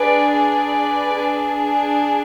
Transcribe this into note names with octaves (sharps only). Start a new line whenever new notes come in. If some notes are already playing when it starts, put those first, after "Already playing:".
Already playing: D4 G#4 B4 D5
B4 D5
D4 G#4